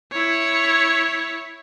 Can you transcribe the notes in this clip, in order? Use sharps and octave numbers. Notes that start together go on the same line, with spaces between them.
E4 C#5